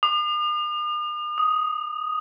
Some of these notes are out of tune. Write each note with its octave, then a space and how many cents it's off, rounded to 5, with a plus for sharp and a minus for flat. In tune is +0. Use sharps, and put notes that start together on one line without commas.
D#6 -45
D#6 +5